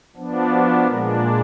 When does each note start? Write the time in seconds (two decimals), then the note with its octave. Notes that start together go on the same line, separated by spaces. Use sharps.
0.16 F3 B3 D4
0.51 F#4
0.88 A#2 G#3 D4 A#4